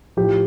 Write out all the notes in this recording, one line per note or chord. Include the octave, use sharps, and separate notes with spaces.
A2 F3 G4